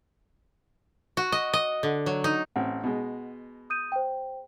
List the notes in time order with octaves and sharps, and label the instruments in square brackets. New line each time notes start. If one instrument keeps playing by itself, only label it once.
[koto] F#4
D#5
D#5
D3
F#3
D#4
[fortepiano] A1 C4 [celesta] F#5
[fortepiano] B2 G#3
[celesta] D#6 G6 D#7
C5 G5